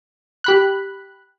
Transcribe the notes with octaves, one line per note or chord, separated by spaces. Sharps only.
G4 B5 F#6